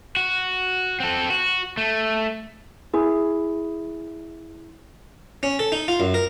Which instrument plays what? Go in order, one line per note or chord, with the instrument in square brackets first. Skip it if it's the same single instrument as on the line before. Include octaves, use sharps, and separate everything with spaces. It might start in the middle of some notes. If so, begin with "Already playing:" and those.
[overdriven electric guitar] F#4
C4 A4
F#4
A3
[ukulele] E4 G#4
[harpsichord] C#4
A4
D#4
F4
F#2
A#4